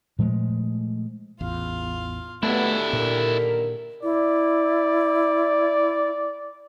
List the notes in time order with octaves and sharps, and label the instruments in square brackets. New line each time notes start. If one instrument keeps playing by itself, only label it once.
[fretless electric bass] A#2 F3 G#3 A3
[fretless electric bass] A1 E2 [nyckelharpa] F4 F5
[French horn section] D#2 F#3 B3 [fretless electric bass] A3 [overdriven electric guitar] D4 E4 [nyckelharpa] G4 A4
[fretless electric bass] A#2 [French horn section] D3 D#3 A#4
[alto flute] E4 [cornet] D5